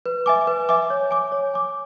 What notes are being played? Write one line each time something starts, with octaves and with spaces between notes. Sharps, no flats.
B4
E5 G#5 D6
B4
E5 G#5 D6
C#5
G#5 D6
C#5
G#5 D6